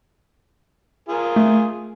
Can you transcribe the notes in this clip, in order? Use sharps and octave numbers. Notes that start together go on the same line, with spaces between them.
F4 G#4 A#4
A3